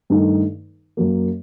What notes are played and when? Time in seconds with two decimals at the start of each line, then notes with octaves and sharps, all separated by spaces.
0.10 G2 D#3 A3 D#4 A4
0.97 F#2 F#3 A#3